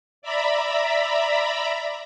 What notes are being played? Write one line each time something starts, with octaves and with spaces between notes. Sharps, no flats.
D5 E5 A#5 B5